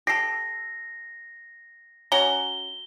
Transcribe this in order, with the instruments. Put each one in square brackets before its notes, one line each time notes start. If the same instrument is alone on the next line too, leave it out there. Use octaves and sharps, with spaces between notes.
[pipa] G4 A4 [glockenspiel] A#6 C7
[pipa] C#4 F#4 A#5 [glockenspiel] G7